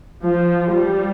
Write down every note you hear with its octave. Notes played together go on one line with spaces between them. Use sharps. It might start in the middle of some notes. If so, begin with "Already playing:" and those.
F3
G3